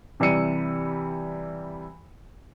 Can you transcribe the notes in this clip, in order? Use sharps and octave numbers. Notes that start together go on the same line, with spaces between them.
C3 E3 G3 E6 C#7 D#7